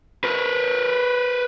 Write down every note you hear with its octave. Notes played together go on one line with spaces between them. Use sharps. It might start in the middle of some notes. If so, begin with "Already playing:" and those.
A#4 B4